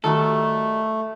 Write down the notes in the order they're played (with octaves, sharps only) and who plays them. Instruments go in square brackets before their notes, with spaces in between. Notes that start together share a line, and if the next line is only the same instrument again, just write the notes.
[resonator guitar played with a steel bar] D#3 G3 F#4 [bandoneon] A3 [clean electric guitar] A4